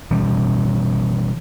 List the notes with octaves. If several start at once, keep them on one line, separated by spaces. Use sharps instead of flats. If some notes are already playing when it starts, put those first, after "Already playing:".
B2 E3 G3 C#4